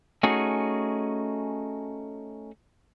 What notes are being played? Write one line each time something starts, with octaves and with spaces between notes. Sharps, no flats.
A3 C#4 D#4 F#4 G#4